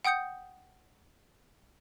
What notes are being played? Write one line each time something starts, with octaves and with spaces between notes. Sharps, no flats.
F#5 G5 D#6 G6 C#7